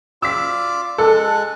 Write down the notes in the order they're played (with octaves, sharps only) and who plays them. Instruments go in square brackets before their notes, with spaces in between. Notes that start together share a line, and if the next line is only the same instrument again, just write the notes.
[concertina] F4 D5 D6 [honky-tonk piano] E6 B6
[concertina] G#3 F#6 [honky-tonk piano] A4